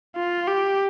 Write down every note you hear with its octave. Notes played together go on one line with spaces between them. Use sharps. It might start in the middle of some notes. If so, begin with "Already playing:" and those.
F4
G4